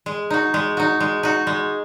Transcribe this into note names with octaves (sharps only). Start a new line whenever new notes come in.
G#3
D#4 F#4
G#3
D#4 F#4
G#3
D#4 F#4
G#3